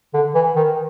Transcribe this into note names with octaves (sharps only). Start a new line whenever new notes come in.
D3
E3
D#3